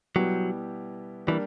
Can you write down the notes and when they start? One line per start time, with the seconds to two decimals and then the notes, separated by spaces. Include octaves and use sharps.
0.16 B2 F#3 G3 B3 E4 G4
1.27 E3 G3 A#3 D4 A#4